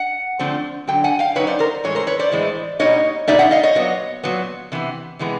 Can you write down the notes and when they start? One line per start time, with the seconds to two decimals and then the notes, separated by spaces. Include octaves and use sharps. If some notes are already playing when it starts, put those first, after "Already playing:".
Already playing: F#5
0.39 D3 F3 A3 C4
0.87 D3 F#3 G5
1.04 F#5 G#5
1.19 F5 G5
1.35 D3 F#3 A#3 D#4 B4 C#5
1.47 C5 D5
1.59 A#4 C5
1.84 A2 E3 G#3 C#5
1.95 A#4 C5
2.07 B4 C#5
2.19 C5 D5
2.32 A2 E3 G#3
2.79 B2 G3 A#3 D#4 C#5 D#5
3.28 B2 G3 A#3 D#4 D5 E5
3.39 E5 F#5
3.51 D#5 F5
3.63 C#5 D#5
3.75 A#2 F#3 B3
4.23 A#2 F#3 B3
4.72 C3 E3 B3
5.19 C3 E3 G#3 B3